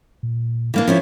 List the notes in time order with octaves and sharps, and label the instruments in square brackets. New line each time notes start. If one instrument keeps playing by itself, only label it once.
[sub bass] A#2
[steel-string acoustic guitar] E3 A#3 D4
F3 C#4 E4